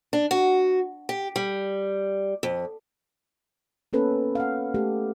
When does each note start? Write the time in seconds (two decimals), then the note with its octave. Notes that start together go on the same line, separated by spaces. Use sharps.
0.13 D4
0.31 F#4
1.09 G4
1.36 G3
2.43 F2
3.93 A#3 B3 C#4 A4 B4
4.35 F5 F#5
4.74 A3 G4 A4